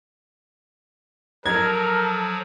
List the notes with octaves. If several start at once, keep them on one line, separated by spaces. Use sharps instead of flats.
F3 F#3 A4 A#4 G#6